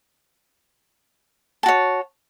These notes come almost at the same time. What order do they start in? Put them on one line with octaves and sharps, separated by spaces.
A5 F#4 C#5